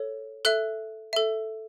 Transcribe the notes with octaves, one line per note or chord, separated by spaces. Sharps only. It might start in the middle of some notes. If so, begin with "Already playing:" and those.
Already playing: A4 C#5
A4 E5 F#6
A4 E5